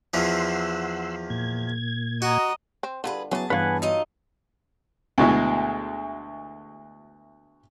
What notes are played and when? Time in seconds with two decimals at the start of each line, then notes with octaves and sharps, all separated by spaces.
0.14 E2 E3 F3 F#5 C6 E6
1.30 A#2 G#6
2.22 F#4 D#5 A#5
2.83 C4
3.04 E2 D3 G3 F4 G#4 B4
3.31 E3 F#3 B3 C#4 G#4 A5
3.50 G2 E3 B3 B4 C#5 F5 F#5 G#5
3.82 F#3 D#4 F4 D#5
5.18 D2 B2 G#3 E4